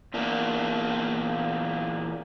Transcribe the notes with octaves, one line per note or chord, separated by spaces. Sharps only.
E2 A#2 A#3 D4